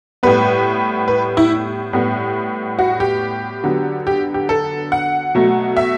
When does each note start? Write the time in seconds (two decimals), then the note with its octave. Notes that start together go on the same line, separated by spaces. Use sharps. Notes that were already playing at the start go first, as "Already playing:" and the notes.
0.23 A2 G3 B3 B4
1.08 B4
1.37 E4
1.93 A2 G3 B3
2.79 F#4
3.00 G4
3.63 D3 F#3 B3
4.07 G4
4.34 G4
4.49 A4
4.92 F#5
5.35 B2 F#3 A3
5.77 E5